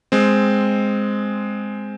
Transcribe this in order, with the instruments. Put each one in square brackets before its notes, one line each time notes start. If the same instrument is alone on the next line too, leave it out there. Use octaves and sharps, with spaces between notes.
[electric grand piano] G#3 C4